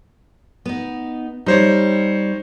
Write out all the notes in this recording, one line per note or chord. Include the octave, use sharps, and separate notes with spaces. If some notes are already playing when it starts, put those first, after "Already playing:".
B3 D#4
G3 C4 D#4 C5 C#5